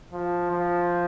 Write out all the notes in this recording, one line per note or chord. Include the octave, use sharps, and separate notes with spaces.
F3
F3